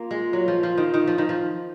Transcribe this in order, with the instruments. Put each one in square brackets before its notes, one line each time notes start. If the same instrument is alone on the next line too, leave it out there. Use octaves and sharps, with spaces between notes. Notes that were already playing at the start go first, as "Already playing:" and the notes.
Already playing: [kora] A#3 [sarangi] F4
[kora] G#3
F#3
F3
F3
D#3
D#3
F3
D#3
F3